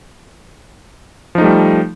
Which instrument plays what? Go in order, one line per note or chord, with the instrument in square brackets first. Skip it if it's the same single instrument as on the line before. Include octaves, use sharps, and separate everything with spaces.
[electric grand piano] F3
D#4
A3
G3